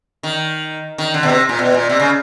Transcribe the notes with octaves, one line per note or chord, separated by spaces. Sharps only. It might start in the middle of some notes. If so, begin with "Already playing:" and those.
D#3
D#3
D3
B2
C3
A#2
B2
A#2
C3
C#3